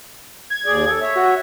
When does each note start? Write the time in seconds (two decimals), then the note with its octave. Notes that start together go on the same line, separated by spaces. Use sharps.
0.50 G#6
0.66 D#2 G#4 D5
0.87 A4
1.02 C#5 E5
1.15 F#4